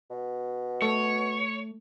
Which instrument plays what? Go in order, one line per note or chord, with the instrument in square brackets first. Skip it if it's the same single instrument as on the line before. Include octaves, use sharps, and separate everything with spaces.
[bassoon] B2
[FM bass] A3 [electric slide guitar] C#5